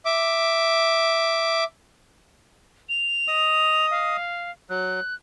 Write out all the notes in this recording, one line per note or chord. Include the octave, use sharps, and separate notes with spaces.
E5 D6
F7
D#5 D#6
F5
F#3 F#6